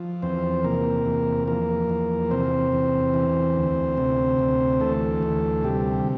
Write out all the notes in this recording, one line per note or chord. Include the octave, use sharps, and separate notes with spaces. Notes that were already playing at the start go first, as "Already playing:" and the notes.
Already playing: F3
E2 C4 C5
C3 A#3 A#4
E2
F3 A#3 A#4
E2
C3 C4 C5
E2
E3
D2
C3
D2
E3 A3 A4
D2
C3 G3 G4